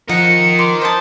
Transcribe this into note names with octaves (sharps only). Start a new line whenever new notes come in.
F3 A#4 D#5 F#5 C#7
C6 D6
C5 A5 D#6